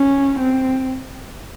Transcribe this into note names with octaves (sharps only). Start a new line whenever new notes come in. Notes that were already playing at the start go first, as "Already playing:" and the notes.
Already playing: C#4
C4